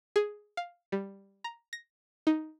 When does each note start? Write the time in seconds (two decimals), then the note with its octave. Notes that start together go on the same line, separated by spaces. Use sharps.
0.16 G#4
0.57 F5
0.92 G3
1.44 A#5
1.73 A#6
2.27 D#4